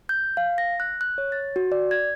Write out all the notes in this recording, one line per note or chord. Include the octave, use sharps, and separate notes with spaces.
G6
F5
A#6
F#6
F#6
C#5
A6
F#4
D5
G#6